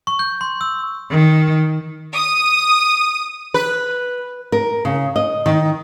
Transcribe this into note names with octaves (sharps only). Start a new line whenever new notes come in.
C#6
G6
C6
E6
D#3
D#6
B4
A#4
C#3
D#5
D#3